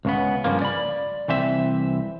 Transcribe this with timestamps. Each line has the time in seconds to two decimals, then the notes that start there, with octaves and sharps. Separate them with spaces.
0.05 C#2 C#3 B3
0.44 G2 C#3 F3 A#3
0.62 D5 B5
1.28 C2 E3 C4 E5